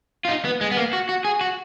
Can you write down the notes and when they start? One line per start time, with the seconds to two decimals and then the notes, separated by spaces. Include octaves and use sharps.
0.25 F4
0.29 D#4
0.45 B3
0.61 G#3
0.71 B3
0.77 A#3
0.93 F#4
1.09 F#4
1.25 G#4
1.41 F#4